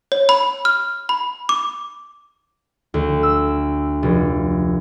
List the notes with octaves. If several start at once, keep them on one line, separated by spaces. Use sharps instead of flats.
C#5
B5
F6
B5
D6
D2
E6
F1